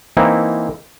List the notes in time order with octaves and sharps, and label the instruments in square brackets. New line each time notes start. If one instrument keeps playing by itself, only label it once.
[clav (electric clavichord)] E3 A#3 C4 D#4 E4